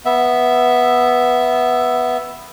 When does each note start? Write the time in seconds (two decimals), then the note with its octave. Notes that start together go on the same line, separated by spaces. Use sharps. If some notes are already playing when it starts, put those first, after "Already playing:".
0.05 B3 E5